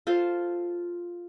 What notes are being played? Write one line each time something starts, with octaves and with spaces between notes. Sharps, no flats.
F4 A4 C5